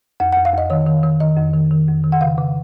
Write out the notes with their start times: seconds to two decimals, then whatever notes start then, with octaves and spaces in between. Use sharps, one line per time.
0.20 F2 F#5
0.33 F2 F#5
0.45 F5
0.54 F2 D#5
0.70 D#3 C#5
0.86 D#3
1.03 D#3
1.20 D#3 D#5
1.37 F2
1.53 D#3
1.71 D#3
1.88 F2
2.04 D#3
2.12 F#5
2.21 C#3 F5
2.38 C#3